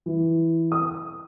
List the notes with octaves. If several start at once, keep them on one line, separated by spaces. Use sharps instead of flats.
E3
D#6